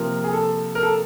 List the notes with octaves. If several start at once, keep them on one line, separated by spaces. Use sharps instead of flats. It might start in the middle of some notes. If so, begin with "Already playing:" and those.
Already playing: C3 F3 A#3 A#4
G#4
A4
A#4
A4